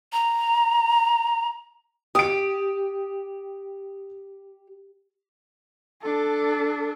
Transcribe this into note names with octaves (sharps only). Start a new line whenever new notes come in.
A#5
G4 D#6 D7
D4 A4